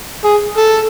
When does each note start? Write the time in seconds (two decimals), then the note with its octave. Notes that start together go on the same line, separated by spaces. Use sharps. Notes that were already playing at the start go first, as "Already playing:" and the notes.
0.25 G#4
0.58 A4